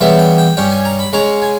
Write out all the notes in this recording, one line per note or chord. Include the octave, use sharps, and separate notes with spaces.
C#3 E3 G3 B3 E5
G5
G5
G2 G3 C#4 G5
G#5
A#5
B5
C#3 G#3 C#4 A#5
G#5